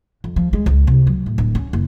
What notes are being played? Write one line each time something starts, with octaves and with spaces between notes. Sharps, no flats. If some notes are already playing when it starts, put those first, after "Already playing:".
F2
F3
G#3
C#2
C3
F#3
A2
D1
C#4
F#1